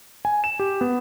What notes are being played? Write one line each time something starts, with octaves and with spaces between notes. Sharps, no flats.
G#5
E7
G4
B3